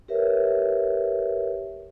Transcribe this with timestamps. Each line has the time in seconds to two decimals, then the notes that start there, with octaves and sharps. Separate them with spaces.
0.08 G4 A#4 B4 C#5 E5